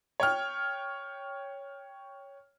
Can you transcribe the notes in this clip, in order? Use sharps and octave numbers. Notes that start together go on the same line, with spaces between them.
C#5 G5 F6